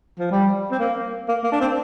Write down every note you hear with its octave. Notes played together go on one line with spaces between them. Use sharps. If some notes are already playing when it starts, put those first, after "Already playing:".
F3
G3
C4
A#3
A#3
A#3
D4
C4